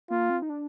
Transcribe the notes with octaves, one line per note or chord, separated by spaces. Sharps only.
A#3 F4
C4
D#4
D4